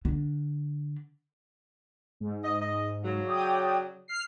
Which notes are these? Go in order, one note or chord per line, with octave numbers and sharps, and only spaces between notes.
D3
G#2
D#5
D#5
C#3 F#3
D5 G5 D#6
F6 C7